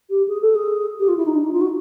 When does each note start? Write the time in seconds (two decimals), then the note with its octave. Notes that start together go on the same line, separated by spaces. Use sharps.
0.10 G4
0.28 G#4
0.41 A4
0.55 G#4
0.99 G4
1.08 F4
1.17 E4
1.25 D#4
1.35 D4
1.43 D#4
1.53 F4
1.61 F#4